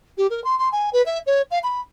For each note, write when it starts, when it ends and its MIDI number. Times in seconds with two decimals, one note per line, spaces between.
0.17 0.26 67
0.30 0.43 70
0.44 0.58 84
0.59 0.69 84
0.72 0.89 80
0.93 1.04 71
1.05 1.19 76
1.26 1.41 73
1.51 1.58 77
1.63 1.80 83